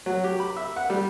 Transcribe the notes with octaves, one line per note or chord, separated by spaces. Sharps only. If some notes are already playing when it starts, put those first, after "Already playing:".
F#3
G4
B5
E5
F#5
G3